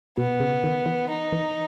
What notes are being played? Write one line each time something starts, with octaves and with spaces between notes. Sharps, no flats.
B2 B3
C#3
D#3
E3
D#4
E3